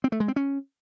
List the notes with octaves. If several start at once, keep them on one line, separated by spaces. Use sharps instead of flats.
C4
A3
G#3
C4
C#4